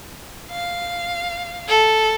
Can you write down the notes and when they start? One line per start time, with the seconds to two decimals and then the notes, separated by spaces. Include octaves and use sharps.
0.51 F5
1.68 A4